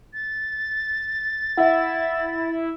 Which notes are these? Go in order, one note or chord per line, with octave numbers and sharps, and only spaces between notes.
A6
E4 E5 F#5